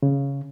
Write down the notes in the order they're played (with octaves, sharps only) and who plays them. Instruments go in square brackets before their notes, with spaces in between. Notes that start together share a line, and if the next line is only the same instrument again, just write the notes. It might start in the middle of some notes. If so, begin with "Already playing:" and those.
[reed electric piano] C#3